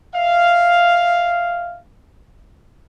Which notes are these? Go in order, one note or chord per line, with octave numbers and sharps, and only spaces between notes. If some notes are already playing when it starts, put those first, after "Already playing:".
E5 F5